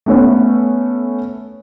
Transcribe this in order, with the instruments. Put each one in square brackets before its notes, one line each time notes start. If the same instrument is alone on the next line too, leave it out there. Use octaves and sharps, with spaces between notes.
[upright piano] A3 B3 C#4